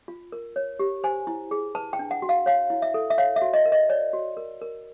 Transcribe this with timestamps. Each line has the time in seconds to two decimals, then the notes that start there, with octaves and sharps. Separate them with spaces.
0.08 F4
0.32 A#4
0.56 C#5
0.79 G4
1.04 C5 G#5
1.27 E4
1.51 G#4
1.75 B4 A5
1.93 G5
1.99 D4
2.11 F#5
2.22 F#4
2.29 F5
2.46 C#5 F5
2.70 E4
2.82 E5
2.94 A4
3.10 E5
3.18 C#5 F5
3.36 E5
3.42 F#4
3.53 D#5
3.66 A#4
3.72 D#5
3.90 C#5 D5
4.13 F#4
4.37 A#4
4.61 A#4